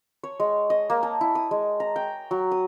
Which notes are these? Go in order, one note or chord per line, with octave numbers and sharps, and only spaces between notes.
C#5
G#3
D#5
A#3
A5
E4
D#6
G#3
A#5
G5
F#3
D#6